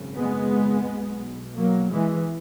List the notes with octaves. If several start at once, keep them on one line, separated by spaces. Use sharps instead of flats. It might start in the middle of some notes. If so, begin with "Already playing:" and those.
Already playing: G#1 F#2 C#3
G#3 B3
B1 B2
F#3 A#3
E3 G#3